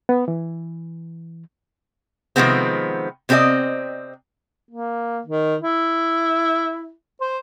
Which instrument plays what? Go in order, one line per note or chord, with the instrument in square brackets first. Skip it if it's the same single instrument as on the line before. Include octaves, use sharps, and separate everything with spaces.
[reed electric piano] B3
E3
[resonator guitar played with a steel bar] C3 D#3 F3 G#3 B3 C4
C3 C4 D#4 G4 D5 D#5
[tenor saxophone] A#3
D#3
E4
C5